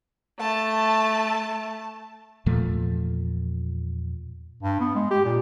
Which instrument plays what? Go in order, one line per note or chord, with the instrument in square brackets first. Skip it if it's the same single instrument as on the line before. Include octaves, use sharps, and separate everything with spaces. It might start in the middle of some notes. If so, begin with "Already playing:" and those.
[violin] A3 [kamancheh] A5
[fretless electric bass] E2 A#2 F3 A3
[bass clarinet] G2
B3
G#3
G4
A#2